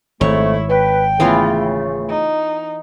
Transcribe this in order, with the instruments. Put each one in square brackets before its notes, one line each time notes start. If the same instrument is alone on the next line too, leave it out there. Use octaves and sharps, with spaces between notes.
[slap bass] G#1 G#2 [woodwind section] F2 A3 [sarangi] E4 [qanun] C#5
[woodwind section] B4 [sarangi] G5
[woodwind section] C#3 A3 [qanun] E3 B3 F4
[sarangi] D#4